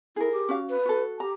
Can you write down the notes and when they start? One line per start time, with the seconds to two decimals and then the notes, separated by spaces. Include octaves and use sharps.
0.16 E4 G#4 A#4
0.32 G4
0.49 C#4 F#4 F5
0.70 B4
0.85 F#4 A4
1.20 G4 A#5